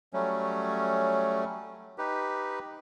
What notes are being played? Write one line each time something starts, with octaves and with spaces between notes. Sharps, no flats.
F#3 G3 A3 C#4
D#4 G4 B4